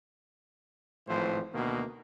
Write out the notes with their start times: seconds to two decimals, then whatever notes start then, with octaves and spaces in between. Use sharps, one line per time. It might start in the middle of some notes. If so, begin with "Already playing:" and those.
1.07 G#1 A2 E3 F3 C5
1.52 D2 B2 D#3 A#3